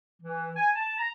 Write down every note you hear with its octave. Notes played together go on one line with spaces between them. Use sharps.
E3
G#5
A5
A#5